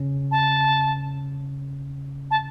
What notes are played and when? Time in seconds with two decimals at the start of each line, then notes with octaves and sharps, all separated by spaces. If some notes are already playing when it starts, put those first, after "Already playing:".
Already playing: C#3 C#4
0.31 A5
2.31 A5